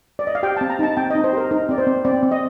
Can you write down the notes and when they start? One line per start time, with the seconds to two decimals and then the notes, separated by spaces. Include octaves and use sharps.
0.19 D5
0.27 D#5
0.35 F5
0.43 G4 G5
0.57 C4 A5
0.70 A#5
0.79 D#4 A5
0.97 C4 G5
1.10 D#4 D#5
1.24 C5
1.33 G4 A#4
1.51 D#4 A#4
1.69 C4 D5
1.78 C5
1.87 C4
2.05 C4 D5
2.23 C4
2.31 D#5